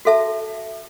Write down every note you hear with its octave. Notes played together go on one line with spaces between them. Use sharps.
F#4 A4 E5 A5